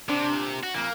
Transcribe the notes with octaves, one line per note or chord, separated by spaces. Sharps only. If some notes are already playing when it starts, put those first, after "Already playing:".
C3 D4
A#2
F#4
F2 A#2 A#3